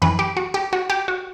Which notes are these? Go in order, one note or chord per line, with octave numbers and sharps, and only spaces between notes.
F#2 E3 B4
G4
F#4
G4
F#4
G4
F#4